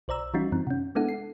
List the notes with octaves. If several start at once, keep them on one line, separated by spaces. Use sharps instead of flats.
B1 C5 D5 A#5 E6
E3 G3 C#4 D#4 F4 F#4
F#2 E3 C4
C3 C#4
G#3 B3 D4 E4 A4 F#5
C7